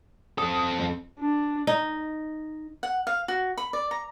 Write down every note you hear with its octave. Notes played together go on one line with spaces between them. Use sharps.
C4 A4 D#6
F2
D4
D#4
F#5
F5
F#4
B5
D5
A#5